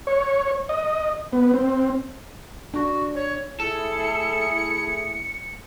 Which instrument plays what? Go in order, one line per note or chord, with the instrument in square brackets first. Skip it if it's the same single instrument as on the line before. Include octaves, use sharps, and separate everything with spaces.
[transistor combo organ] C#5
D#5
B3
C4
[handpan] D4 [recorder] F#4
[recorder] C#5
[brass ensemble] A3 E4 G#4 [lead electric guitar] A4 [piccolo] C#7